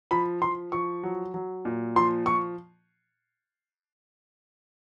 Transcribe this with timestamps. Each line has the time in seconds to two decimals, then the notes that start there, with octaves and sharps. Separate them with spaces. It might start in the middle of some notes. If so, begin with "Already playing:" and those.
0.11 F3 B5
0.42 F3 C6
0.72 F3 C#6
1.03 F#3
1.34 F#3
1.65 A#2
1.96 F3 C6
2.26 F3 C#6